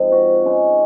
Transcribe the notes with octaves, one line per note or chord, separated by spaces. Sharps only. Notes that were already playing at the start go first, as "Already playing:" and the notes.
Already playing: G#2 F3 C4 D#4
F#4
C#3 G#3 D#4